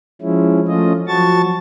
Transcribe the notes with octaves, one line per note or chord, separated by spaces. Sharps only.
F3 G#3 C#4 E4
F3 A3 C#4 F4 D#5
F3 F#3 F#4 A5 C#6 A6